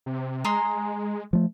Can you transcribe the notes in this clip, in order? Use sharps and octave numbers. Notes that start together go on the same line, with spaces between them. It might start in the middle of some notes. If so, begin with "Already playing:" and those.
C3
G#3 G#4 A#5 C6
F3 A3